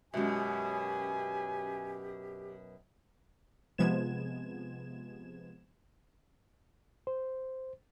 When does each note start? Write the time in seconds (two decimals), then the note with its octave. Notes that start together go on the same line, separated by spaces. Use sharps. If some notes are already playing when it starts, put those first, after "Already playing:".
0.14 F#2 B2 G#3 F#4 G4 E5 G#5
3.78 C3 F3 G#3 B3 G#6 E7
7.07 C5